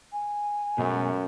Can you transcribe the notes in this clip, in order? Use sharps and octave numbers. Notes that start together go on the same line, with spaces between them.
G#5
F#2 B2 G#3 A3